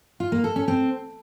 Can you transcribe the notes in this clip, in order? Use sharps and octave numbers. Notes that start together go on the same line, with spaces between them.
F4
A#3
A4
C#4
C4